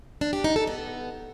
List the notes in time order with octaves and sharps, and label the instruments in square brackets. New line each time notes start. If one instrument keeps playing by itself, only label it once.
[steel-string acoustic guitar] D4
G4
D#4
A4
B3